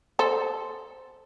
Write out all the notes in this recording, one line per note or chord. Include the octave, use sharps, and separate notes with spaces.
A4 C5